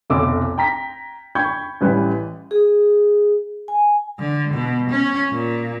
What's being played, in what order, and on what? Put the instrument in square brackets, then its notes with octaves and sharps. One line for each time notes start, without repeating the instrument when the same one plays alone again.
[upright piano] F1 B1 D6 E6
G5 A#5 B6
G5 B5 C#6 G6 G#6
A1 E3 G3 B4
[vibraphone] G#4
G#5
[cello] D3
B2
C#4
A#2